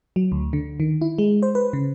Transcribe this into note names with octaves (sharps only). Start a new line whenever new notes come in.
F#3
D2
D3
D#3
E4
G#3
C5
B4
C#3